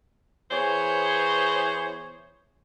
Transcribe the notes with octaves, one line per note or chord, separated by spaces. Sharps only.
E3 B3 G#4 C5 C#5